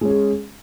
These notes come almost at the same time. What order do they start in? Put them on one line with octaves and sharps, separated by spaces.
G#3 C#4 G#4